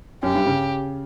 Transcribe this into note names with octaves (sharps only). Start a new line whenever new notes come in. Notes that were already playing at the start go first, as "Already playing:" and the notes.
F#2 G4
G2
C#3